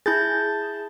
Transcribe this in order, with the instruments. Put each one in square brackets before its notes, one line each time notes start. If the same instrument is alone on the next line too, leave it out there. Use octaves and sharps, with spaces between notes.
[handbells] E4 G6 A6 [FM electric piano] G#4 A5